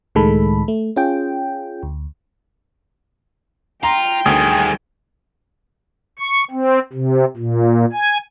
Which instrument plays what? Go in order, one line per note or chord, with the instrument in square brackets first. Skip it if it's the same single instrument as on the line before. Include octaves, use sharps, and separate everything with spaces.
[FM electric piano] C#2 A2 D#3 G#3 A4 B5
A3
C#4 F4 G#4 G5
D2
[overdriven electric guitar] F4 [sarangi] G5 [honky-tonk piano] A#5
[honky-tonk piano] D2 [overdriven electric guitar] D#3 G3 [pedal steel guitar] G#4
[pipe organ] C#6
C4
C3
A#2
G#5